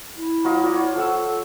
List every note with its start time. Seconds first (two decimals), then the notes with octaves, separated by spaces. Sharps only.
0.17 E4
0.44 F#3 F4 D#5
0.64 F4 D5 F#5
0.76 C#5
0.95 F3 A4 F#5 E6